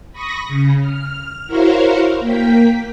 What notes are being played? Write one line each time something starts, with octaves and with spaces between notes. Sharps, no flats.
B5 C#6 D#6 A#6
C#3
F6
E4 F#4 A#4 C5 C#5 F5
A#3 G5 B6